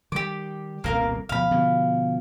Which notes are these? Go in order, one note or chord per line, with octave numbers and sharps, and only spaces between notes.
D#3 G3 G4 D6
D#1 C2 B2 A#3 A#4 F5
D2 B2 F3 F5 B5
B2 D3 F3